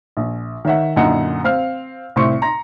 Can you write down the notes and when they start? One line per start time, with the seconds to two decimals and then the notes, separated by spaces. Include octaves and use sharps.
0.17 A#1
0.65 D#3 C#5 E5 F#5
0.96 F#2 A#2 D3 D#4 F#5 C#7
1.44 C4 F5 F6
2.16 C2 A2 C4 C6 C#6 C#7
2.42 A#5 C6 A#6